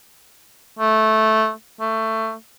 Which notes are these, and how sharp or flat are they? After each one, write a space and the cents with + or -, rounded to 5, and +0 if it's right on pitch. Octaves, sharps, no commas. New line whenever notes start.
A3 -10
A3 +15